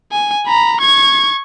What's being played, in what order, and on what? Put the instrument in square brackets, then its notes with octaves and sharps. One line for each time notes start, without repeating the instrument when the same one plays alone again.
[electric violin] G#5
A#5 B5
C#6 G#6